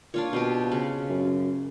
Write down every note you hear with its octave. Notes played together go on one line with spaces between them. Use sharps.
A#2 D4 F4 C#5
B2 C4 F4 G4
C#3
F#2